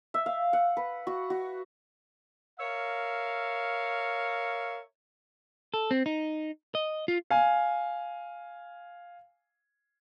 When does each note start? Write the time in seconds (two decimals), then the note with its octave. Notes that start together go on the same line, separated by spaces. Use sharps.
0.14 E5
0.26 F5
0.53 F#5
0.77 B4
1.07 F#4
1.30 F#4
2.60 A#4 C#5 E5 F5
5.74 A4
5.91 C4
6.06 D#4
6.75 D#5
7.08 F4
7.30 F5 G#5